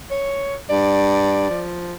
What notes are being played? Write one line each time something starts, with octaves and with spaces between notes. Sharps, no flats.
C#5
G2 D5
F3